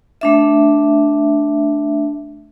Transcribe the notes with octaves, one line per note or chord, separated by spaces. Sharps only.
A3 D4 E5